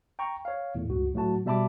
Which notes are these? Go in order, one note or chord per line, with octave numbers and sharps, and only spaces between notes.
G5 A#5 C#6
C#5 F5
E2 A2
C#2 G2 F#4
A2 F#3 A3 F#4 A5
B2 G3 E5 A5 B5 D6